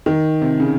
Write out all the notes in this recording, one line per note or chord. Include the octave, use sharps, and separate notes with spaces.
D#3
C3
C#3